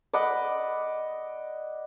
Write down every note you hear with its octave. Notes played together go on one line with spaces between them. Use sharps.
D5 D#5 F#5 B5